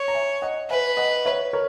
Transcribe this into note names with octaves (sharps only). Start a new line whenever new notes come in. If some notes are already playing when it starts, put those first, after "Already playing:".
Already playing: C#5
A#5
E5 G#5
D#5 F#5
B4 E5 G#5
D#5 F#5
C#5 E5
A#4 C#5